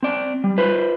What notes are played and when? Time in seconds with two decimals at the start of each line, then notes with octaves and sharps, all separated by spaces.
0.03 C4 D5
0.44 G3
0.58 F4 B4 C5